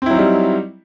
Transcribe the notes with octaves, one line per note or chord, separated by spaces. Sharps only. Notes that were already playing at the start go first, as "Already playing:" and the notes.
F#3 G3 C4 D#4 E4